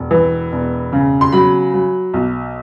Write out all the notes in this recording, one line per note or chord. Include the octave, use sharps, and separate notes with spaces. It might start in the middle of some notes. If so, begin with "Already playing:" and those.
Already playing: E1
E3
E1
C#3
C6
F#3 B5
F#3
B1